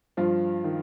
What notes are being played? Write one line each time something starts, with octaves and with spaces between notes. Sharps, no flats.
G2 F3 F4
D#3